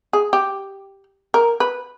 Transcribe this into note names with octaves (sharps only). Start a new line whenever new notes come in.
G#4
G4
A#4
B4